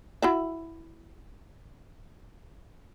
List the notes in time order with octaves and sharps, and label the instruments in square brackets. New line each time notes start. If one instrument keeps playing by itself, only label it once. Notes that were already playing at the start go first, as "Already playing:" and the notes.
[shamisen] E4 F#4 E5